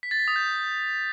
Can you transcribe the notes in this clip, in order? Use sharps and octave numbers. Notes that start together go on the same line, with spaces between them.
B6
A6
B6
D#6
G6